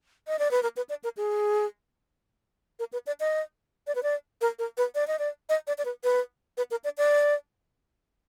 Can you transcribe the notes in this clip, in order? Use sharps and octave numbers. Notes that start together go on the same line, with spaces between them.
D#5
D5
B4
A#4
B4
D5
A#4
G#4
A#4
B4
D5
D#5
D5
B4
D5
A#4
A#4
B4
D5
D#5
D5
D#5
D5
D5
B4
B4
B4
A#4
D5
D5